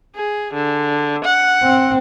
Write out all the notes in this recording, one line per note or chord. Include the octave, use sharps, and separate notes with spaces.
G#4
D3
F#5
C4